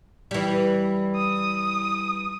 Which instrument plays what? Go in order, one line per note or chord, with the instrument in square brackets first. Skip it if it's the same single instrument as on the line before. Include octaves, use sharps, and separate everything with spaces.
[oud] E3 G3
[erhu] D#6